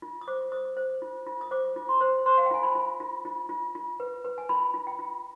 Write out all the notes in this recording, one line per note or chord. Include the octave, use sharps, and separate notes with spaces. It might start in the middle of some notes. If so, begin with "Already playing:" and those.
F4
D#6
C5 D6
C5 D#6
C5
F4
F4
D#6
C5 D6
F4
C6
C5
C5 C6
F5
G5
F4 G#5
B5
F4
F4
F4
F4
F4
B4
B4
G#5
F4 B5
F4
G5
F4